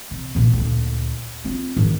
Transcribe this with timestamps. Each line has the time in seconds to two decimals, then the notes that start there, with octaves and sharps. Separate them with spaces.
0.11 C3
0.35 C2 A#2
0.53 D2 A#2
1.45 C4 F4
1.77 G#2 D#3